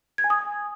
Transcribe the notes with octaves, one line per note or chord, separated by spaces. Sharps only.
G#6
G#5
D#6